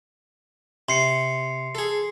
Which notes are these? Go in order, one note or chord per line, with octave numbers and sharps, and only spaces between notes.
C3 C6 C7 C#7
G#4 A4